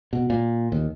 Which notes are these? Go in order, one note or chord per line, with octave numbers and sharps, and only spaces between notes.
B2
A#2
D#2